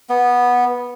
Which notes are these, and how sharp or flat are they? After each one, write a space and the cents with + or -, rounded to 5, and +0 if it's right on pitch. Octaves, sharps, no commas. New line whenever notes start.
B3 -10